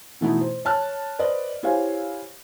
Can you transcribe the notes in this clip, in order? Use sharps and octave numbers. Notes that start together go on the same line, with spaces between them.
B2 E3 A3 B3 D#4 E4
C5
C#5 A5 F6 F#6
B4 C5 D5 D#5
E4 G4 C5 C#5 F5 G#5